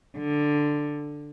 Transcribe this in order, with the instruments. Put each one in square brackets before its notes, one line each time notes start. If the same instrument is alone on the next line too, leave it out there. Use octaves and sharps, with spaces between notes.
[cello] D3